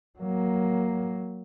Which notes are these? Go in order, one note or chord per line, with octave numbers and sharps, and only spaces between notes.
F#3 A#3